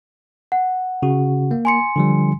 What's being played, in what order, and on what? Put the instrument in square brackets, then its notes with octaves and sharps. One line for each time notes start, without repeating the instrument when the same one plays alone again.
[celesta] F#5
[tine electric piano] C#3 F#4
A#3
[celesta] G#5 C6 C#7
[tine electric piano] D3 F3 G3